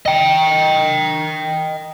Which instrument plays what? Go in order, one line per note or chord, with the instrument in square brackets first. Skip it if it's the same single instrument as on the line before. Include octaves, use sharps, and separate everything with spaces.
[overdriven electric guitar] D#5 G5